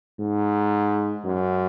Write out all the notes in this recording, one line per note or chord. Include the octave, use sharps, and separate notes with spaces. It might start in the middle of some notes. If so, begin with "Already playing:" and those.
G#2
F#2